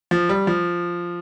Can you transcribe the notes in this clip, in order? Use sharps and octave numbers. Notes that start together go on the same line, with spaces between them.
F3
G3
F3